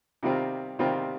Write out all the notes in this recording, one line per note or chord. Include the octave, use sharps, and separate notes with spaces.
C3 D#3 G3 C4 F4
C3 D#3 G3 C4 F4